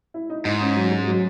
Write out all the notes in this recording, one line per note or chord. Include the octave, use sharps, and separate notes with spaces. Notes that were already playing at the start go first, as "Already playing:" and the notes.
E4
D#4
G#2 D#4
C#4
F#3
G#3
F#3